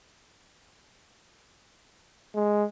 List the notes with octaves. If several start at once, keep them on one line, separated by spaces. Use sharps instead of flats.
G#3